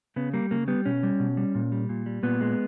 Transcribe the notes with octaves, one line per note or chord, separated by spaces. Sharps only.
C#3 B3
G3 A#3
C#3 A#3
G3 B3
B2 C#4
G3
B2
G3
A#2
G3
A#2
G3
A#2 B3
G#3